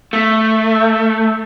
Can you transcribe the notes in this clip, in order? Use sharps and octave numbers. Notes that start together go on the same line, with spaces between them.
A3